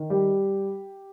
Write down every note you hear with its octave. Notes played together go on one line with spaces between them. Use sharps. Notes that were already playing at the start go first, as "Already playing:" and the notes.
Already playing: D#3
G3 G4